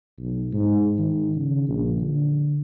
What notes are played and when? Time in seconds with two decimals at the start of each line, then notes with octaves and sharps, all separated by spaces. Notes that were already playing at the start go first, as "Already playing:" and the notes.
0.18 B1
0.53 G#2
0.98 D#3
1.36 C#3
1.69 A#1
2.02 D3